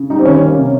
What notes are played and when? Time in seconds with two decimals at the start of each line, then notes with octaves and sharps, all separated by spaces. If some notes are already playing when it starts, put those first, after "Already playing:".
Already playing: C#3
0.10 G3 D#4
0.19 C4
0.25 D#3 C#4
0.41 A#3 C#4
0.57 C3